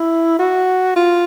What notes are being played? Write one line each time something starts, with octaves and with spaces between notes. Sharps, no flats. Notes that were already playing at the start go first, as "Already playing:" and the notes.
Already playing: E4
F#4
F4